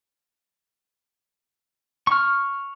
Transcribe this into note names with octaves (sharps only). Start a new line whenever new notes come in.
C#6 F6